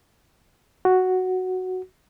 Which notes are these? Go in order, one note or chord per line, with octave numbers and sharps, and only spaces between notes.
F#4